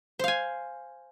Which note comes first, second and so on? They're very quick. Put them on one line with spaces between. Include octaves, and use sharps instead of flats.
C5 F5 G#5